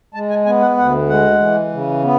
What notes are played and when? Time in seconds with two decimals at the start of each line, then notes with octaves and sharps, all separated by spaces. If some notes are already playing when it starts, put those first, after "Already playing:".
0.14 G#3 A5
0.30 G#5
0.46 B3 G#5
0.62 F#5
0.77 D2 F#5
1.09 G#3 F#5
1.40 E3
1.72 C#3
2.03 B3